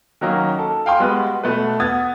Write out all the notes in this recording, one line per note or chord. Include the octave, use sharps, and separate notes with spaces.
D#3 F#3 A#3 C#4 D#4
A4
F5 G5 G#5 C6
G3 G#3 B3 F#4 B4
B2 A3 A4 B4
B3 D#6 G#6 A6